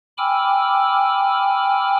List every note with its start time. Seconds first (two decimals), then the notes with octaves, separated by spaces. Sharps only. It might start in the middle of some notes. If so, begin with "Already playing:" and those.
0.18 G5 G#5 B5 D6 E6 F6